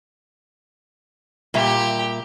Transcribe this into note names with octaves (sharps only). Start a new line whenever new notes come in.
A#2 G3 G4 E5